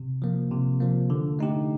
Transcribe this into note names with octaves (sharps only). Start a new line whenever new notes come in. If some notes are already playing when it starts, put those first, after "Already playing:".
Already playing: C3
F3 A#3
C3
F3 A#3
D3
A3 D#4 G4